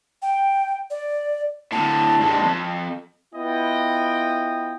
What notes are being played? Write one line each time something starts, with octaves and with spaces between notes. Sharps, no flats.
G5
D5
A2 D3 A5
G2 G#3
F2
B3 E4 F4 D#5 G5